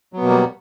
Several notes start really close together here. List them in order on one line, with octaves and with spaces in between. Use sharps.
F#3 B3 B2 A#3 G3